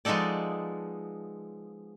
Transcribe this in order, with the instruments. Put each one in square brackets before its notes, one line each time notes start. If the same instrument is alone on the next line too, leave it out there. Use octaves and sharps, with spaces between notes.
[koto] F3 G#3 B3 D#4 A4 D5